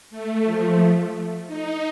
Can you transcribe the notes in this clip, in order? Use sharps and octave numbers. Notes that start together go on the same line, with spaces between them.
A3
F3
D#4